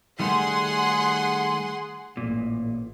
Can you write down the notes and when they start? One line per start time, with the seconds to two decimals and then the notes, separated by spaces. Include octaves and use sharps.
0.19 D#3 G3 A3 G#4 F#5 C6
2.17 A1 A#2